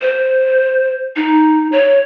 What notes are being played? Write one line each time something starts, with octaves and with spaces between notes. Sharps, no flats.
C5
D#4
C#5